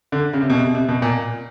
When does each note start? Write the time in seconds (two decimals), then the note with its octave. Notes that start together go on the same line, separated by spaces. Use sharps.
0.12 D3
0.33 C#3
0.41 C3
0.50 B2
0.57 C3
0.75 C3
0.88 B2
1.02 A#2